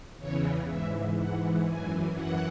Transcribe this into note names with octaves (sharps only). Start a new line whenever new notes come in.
E2 C#3 E3 C#5
G#2 E3 E5
G#2 E3 F#5
F#2 E3 G#5
F#2 E3 F#5